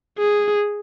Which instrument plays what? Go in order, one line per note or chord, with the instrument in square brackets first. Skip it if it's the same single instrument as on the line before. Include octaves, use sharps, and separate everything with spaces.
[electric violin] G#4